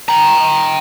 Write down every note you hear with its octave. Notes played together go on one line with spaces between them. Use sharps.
G5 A#5